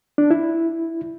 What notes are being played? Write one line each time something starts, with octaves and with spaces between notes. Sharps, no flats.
D4
E4